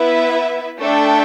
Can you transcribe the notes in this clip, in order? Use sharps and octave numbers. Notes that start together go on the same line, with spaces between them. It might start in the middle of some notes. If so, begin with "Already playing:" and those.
Already playing: B3 E4 B4 E5
A3 D4 A4 E5 G5